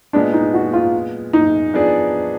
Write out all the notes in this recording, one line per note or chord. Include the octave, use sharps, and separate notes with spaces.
A#2 G#3 B3 D4
D#4
F#4
F4
D#4
F3 B3 D4 G#4 D5